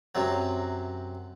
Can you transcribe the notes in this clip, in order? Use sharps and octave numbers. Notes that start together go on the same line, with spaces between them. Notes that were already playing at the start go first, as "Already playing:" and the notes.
F#2 C3 F#3